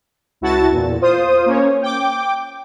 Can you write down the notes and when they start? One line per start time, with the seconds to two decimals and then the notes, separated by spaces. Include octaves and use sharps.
0.41 C#2 E4 F#4 A5 A6
0.71 E2 A#2
1.01 F4 C5 D#6
1.46 A#3 C#4 C#5
1.82 G5 D6